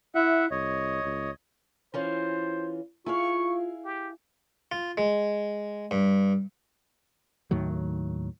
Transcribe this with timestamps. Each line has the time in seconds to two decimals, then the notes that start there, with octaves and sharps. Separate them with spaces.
0.15 E4 E5 F#5
0.51 C2 C#5 D#5
1.04 C#2
1.94 E3 C#4 F4 C5
3.06 E4 F4 G#4 F5 C#6
3.84 G4
4.72 F4
4.98 G#3
5.91 G2
7.51 D#2 A2 D#3 F#3